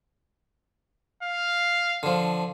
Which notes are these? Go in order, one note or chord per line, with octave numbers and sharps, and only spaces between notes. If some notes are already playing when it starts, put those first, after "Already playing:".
F5
D3 F3